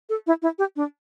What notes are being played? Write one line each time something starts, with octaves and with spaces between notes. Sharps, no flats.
A4
E4
E4
G4
D4